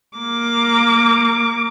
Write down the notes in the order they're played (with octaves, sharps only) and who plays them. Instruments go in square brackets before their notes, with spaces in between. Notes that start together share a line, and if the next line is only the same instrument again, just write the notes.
[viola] A#3 D6